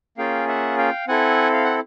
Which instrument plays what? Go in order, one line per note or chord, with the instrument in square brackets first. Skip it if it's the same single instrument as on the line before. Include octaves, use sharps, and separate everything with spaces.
[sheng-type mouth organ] A#3 C#4 F4 G#4 F5 G5
E5 F#5
F5 G5
C4 E4 A4 F#5 G#5
F5
F#5